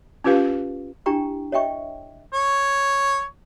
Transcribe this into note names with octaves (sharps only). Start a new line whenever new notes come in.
C#4 F4 G4 B4 F5
D4 E4 G4 G5 A#5 C#6
C#5 D#5 E5 G5 C#6
C#5